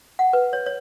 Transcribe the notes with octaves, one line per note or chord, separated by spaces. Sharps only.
F#5
B4
C#5
C#5